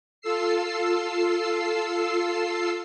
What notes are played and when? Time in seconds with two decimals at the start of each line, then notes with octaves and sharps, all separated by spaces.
0.21 F4 A4 E6 C7